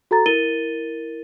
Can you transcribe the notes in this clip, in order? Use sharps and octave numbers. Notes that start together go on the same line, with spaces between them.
F#4 A4 A#5 A6
E4 A#4 A6 D#7 G7